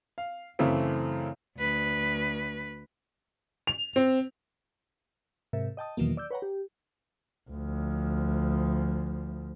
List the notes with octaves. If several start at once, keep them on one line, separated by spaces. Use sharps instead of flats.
F5
F#2 C#3 E3 A3 C4
D2 B4
F7
C4
G#2 C3 A#4 E5
D#5 G5 A5 D#6
E2 B2 D#3 E3 F#3 A#3
D5 E6 G6
B4 C#5 F#5 G5 A#5
G4
D2 F3